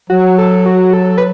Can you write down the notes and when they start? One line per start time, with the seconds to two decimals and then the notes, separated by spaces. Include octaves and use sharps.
0.09 F#3 F#4
0.38 A4
0.66 F#4
0.93 A4
1.18 B4